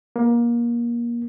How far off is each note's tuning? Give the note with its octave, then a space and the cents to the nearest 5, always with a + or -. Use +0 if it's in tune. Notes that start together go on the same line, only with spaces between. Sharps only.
A#3 +25